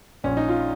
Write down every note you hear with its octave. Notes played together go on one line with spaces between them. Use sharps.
A#1 A#2 C#4
D#4
F4